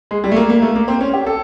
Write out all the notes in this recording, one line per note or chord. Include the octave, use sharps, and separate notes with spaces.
G#3
G3
A3
A#3
A#3
A3
A#3
C4
C#4
G4
A4